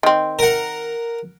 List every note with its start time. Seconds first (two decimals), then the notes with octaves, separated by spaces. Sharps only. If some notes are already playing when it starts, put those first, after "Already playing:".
0.03 D#3 C4
0.39 A#4 F#5